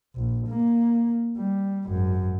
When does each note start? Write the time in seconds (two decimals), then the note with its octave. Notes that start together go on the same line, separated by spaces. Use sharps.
0.15 A#1
0.48 A#3
1.37 G3
1.87 G#1 F#2